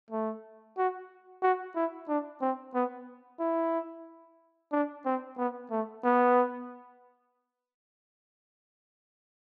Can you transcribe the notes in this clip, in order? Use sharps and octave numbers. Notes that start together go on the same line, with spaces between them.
A3
F#4
F#4
E4
D4
C4
B3
E4
D4
C4
B3
A3
B3